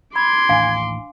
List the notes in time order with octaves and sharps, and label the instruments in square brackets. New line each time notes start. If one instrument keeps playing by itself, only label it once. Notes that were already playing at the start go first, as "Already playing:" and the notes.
[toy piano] B5 [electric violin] C6 D6 [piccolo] G#6
[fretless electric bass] A1 D#2 A2 [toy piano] D4 F5 G#5